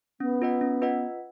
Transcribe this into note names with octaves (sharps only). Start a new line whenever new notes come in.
B3 C#4
F4 B4 D#5 F#5
C#4
F4 B4 D#5 F#5